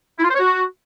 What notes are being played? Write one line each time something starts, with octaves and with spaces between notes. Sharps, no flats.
E4
F4
C5
C#5
F#4